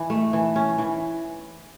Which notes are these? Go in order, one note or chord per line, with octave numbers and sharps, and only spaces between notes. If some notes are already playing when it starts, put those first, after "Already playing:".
Already playing: E3
A3
E3
C#4
E3